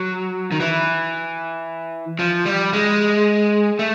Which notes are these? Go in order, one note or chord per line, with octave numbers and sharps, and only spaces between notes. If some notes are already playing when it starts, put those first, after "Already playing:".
Already playing: F#3
D#3
E3
F3
G3
G#3
A3